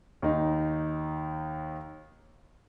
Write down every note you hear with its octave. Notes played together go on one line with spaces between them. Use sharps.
D#2 D#4